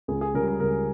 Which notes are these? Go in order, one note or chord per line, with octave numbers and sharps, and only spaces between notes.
C#2 G#4
G#4
C#3 G3 A#4
A#4
C#2 A#4